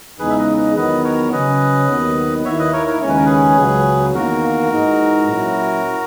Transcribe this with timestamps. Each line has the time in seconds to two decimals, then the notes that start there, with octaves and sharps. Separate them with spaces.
0.19 E2 C#3 G#3 D#4 G#4 B4
0.30 E5
0.38 B4 D#5
0.57 B4 D#5
0.76 E2 D#3 F#3 B3 B4 D#5
1.04 A#4 C#5
1.32 C#3 F#3 C#4 B4 D#5
1.89 D#2 D#3 F#3 B3
2.45 D#2 D#3 A#3 E4 C#5 E5
2.59 B4 D#5
2.73 A#4 C#5
2.87 A#4 C#5
3.02 D#2 C#3 G#3 C#4 C#5
3.09 B4
3.17 A#4
3.26 G#4 B4
3.58 C#2 C#3 F#3
4.14 E2 D#3 A#3 F#4 A#4
4.71 G#2 E3 G#3 D#4
5.27 A#2 F#3 C#4 E4